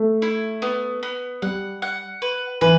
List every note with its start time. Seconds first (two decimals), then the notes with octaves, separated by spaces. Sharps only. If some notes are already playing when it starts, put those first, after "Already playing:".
Already playing: A3
0.22 E4
0.62 B3
1.03 B3
1.42 G3 F#5
1.82 F#5
2.22 B4
2.61 E3 B4